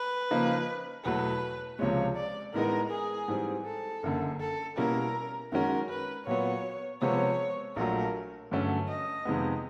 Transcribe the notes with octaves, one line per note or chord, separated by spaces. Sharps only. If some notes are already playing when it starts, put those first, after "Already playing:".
Already playing: B4
C#3 F3 A#3 D#4
E2 B2 F#3 A3 B4
C#2 C3 F3 G#3 C#5
D5
A2 E3 G#3 B3 D#4 A#4
G#4
G#2 E3 G3 C4
A4
F#1 F#2 D3
A4
B2 G3 A#3 C#4 E4 A#4
F#2 D#3 G#3 C#4 F#4 A#4
B4
A#2 F#3 B3 C#5
C3 F3 G#3 B3 C#5
A#1 A#2 F#3 A3 A#4
G2 D3 F#3 A3 C#4
D#5
F2 C3 D#3 G#3 B3